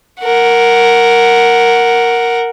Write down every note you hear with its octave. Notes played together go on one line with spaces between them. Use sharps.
A#4 F#5